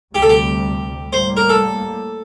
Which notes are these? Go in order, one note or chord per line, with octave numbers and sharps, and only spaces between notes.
D2 C3 G3 G4
A4
G4
A2 G3 A#3 C5
A#4
A4